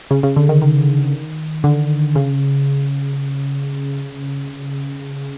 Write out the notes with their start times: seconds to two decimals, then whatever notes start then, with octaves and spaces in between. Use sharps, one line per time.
0.11 C#3
0.23 C#3
0.36 D3
0.49 D#3
0.62 D#3
1.64 D3
2.15 C#3